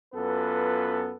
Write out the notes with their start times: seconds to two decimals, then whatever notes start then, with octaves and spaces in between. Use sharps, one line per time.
0.14 F#2 B3 F4 A4 B4